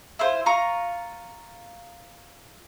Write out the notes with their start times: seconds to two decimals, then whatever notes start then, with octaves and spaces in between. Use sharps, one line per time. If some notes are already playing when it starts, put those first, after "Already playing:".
0.19 E4 F4 C5
0.46 F4 A#5 C#6